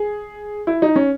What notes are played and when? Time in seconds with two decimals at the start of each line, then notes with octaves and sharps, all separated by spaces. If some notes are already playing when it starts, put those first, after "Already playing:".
Already playing: G#4
0.67 E4
0.82 D#4
0.96 C#4